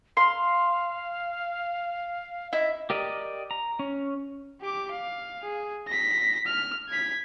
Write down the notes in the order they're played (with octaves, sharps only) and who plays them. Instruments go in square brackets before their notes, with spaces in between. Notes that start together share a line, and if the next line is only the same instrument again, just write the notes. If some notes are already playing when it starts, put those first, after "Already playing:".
[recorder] F5 [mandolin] C6
[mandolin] E4 [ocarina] D#5
[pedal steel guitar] G4 A#4 D5 D#5
A#5
C#4
[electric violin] G4 D6
F5
G#4
A#6 B6
F6
G#6 B6